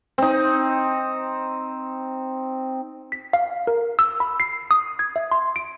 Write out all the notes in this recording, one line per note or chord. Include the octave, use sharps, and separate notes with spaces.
C4 D#4
B6
F5
A#4
E6
B5
C7
D#6
G#6
E5
C6
D7